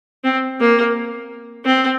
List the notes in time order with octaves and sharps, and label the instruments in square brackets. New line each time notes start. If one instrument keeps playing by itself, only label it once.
[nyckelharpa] C4
A#3
C4